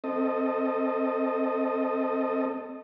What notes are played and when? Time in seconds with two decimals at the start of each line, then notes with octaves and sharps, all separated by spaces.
0.04 C4 A4 D#5